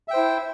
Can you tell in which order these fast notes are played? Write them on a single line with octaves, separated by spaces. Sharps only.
E5 G5 C5 E4